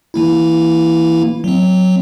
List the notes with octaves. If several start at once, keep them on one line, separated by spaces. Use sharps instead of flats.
E3 A#3 E4
F#3 C4